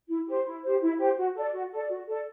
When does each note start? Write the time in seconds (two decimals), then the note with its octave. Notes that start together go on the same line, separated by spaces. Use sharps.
0.08 E4
0.26 G4 C5
0.45 E4
0.63 G4 C5
0.81 E4
0.99 G4 C5
1.17 F#4
1.35 A4 D5
1.53 F#4
1.72 A4 D5
1.90 F#4
2.07 A4 D5